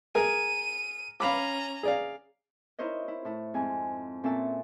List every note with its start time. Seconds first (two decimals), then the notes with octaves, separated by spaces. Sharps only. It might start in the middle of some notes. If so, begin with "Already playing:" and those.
0.15 G#4 A#4 G#5 D#7
1.20 C#4 F5 A#5 B5 D6
1.83 G#4 D5 F5
2.79 D#4 E4 A#4 C5 C#5 D#5
3.08 E4
3.25 A2 E4
3.54 F2 G#2 G#5
4.24 A#2 C4 C#4 A4 E5 A5